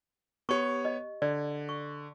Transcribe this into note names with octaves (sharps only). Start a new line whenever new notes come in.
B3 G4 C#5 C#6
D#5
D3 D5
C#6